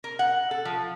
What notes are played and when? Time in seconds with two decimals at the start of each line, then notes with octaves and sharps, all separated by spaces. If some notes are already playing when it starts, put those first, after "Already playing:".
0.04 A#4
0.19 F#5
0.51 A4
0.65 F3